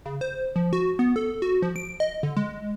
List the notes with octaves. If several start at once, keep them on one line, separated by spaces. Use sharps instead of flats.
C#3
C5
F3
F#4
B3
A4
F#4
F3
D7
D#5
D3
G#3